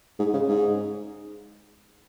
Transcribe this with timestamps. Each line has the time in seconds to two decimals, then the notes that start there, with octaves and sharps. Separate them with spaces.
0.19 G#2
0.33 C#3
0.48 G#2